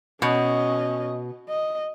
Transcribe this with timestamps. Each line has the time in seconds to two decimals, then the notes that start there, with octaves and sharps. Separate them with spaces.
0.22 B2 C#4 D#5
1.49 D#5